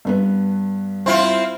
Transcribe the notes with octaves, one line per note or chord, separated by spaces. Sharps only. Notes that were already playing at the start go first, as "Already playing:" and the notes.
G2 B3 B4
C4 E4 F4